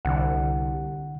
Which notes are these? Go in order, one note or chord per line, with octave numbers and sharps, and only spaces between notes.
C2 D3 F#5